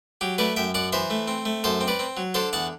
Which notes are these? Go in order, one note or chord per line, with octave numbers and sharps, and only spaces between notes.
F#3 G4
A3 B4 D5
F#2 E5 G5
F#2 D5 F#5
E3 C5 E5
A3
C4
A3
F#2 A4 C5
C4
B4 D5
C4
F#3
D3 A4 C5
E2 F#5 A5